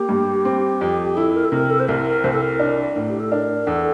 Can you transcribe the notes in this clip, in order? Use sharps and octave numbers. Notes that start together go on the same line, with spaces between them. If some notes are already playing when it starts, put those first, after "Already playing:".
Already playing: A#3 G4
G2
C4
F2
E4 A4
A#4
A4
C3 A#4
A4
C5
C2 A#4
A#4
C2 C5
A4
A#4
D4
A2
G4
A4
D4 A#4
E2 A4